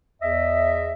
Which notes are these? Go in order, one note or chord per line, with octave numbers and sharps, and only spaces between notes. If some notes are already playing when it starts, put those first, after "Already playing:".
E2 D#5 E5